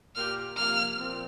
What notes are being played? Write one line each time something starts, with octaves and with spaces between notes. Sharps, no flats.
A#2 A#3 G4 F6
C3 F3 A#3 F6
A#2 F3 C4